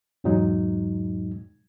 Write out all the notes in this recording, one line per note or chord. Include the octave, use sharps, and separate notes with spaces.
E2 G#2 B2 F#3 G#3 D#4